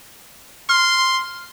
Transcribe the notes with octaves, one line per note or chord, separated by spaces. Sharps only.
C6 F6